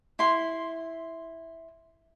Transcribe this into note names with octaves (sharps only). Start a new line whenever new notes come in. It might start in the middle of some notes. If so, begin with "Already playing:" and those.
E4 C6